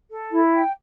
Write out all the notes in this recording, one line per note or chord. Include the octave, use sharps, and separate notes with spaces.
A4
E4
G5